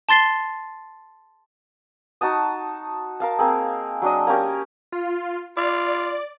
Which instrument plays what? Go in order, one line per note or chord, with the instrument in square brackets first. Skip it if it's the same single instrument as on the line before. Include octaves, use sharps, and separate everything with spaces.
[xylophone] A5 C6 A6 C7 G7
[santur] D#4 F#4 A5 D#6
A#4 F5 A5
A#3 C4 G#4
F#3 D4 D#5
A#3 C#4 G4 A#4
[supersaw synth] F4
[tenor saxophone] F4 [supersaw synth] D5